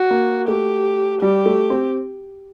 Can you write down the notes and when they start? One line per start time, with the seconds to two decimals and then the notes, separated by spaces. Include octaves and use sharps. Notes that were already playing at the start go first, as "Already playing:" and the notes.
Already playing: F#4
0.11 A#3
0.48 A3 G4
1.21 G3 G4
1.46 A3
1.70 C4